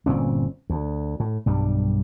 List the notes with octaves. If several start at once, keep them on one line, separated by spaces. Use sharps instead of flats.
G1 A#2 C4 C#4
D2
A2
B1 G2 G3